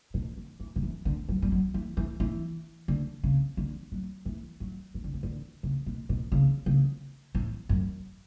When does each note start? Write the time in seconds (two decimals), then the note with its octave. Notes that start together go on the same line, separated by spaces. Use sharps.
0.14 B2
0.37 D3
0.60 E3
0.76 D3
0.83 E3
1.05 D3
1.29 F#3
1.42 G3
1.52 F#3
1.74 E3
1.97 E3
2.20 E3
2.88 D3
3.23 C#3
3.57 D3
3.92 F#3
4.26 E3
4.60 F#3
4.94 E3
5.04 D3
5.14 C#3
5.23 D3
5.63 C#3
5.86 B2
6.09 B2
6.32 C#3
6.66 C#3
7.35 A2
7.69 F#2